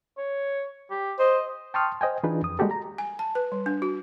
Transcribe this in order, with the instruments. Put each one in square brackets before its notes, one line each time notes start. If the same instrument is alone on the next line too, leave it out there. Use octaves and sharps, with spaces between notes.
[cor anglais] C#5
G4
[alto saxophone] C5 [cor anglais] D#5
[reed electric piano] G5 A5 C6 C#6 D#6 F6
C5 D#5 G5 G#5
E3 D4 D#4 F4 G#4 B4
F2 D#6
G3 G#3 A#3 F#4 G4 A4
A#5
[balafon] G#5
A5
B4
G3
D4
F#4